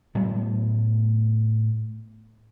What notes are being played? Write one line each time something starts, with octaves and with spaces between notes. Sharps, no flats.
A2 F#3 A3 B3